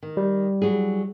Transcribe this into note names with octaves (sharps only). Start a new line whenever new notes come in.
D#3
G3
F#3 E4 G#4